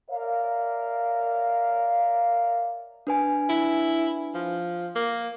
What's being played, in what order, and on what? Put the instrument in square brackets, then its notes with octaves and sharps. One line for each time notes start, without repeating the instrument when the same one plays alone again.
[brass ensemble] A#4 C#5 D5 E5 F5
[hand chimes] D4 B4 G#5
[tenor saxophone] E4
F3
A#3